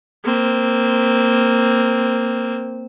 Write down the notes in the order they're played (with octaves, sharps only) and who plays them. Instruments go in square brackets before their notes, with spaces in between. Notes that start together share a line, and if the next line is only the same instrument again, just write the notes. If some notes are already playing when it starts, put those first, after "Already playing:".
[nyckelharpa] A#3 C4